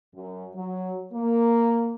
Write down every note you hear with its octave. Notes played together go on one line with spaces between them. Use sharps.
F#2
F#3
A#3